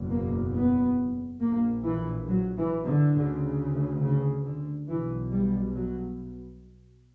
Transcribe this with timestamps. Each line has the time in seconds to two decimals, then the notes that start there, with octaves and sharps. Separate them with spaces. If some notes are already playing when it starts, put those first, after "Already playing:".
Already playing: F#1 E2 B2
0.10 A#3
0.54 B3
1.41 A#1 A#2 A#3
1.85 E3
2.27 F#3
2.57 E3
2.86 D3
3.14 D2 C#3
4.01 C#3
4.44 D3
4.88 B1 B2 E3
5.32 G3
5.75 F#3